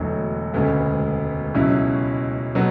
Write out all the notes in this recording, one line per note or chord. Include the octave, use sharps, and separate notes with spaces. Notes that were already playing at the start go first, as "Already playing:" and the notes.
Already playing: E1 E2 D3 F#3 A3
E1 D2 C#3 G#3 B3
C#2 B2 F#3 C#4 E4
B2 F#3 B3